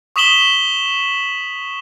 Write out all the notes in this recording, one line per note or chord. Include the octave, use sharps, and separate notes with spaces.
C#6 D#6 B6 E7 F#7 G7